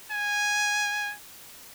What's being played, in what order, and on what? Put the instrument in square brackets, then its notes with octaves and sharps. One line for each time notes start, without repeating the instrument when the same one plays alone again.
[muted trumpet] G#5